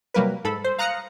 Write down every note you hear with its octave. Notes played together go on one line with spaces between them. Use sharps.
C3 F#3 G3 A#3 A#4 B4
G#2 A4 B5
C5
F5 A#5 D#6 F#6 A#6 C#7